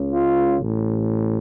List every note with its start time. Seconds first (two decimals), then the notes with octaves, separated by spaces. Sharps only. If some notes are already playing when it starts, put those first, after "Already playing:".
Already playing: C#2 C#3
0.10 F4
0.60 A1 A2